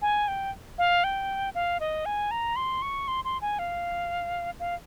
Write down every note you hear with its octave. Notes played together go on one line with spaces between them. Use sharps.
G#5
G5
F5
G5
F5
D#5
G#5
A#5
C6
C#6
C6
C6
G#5
F5
F5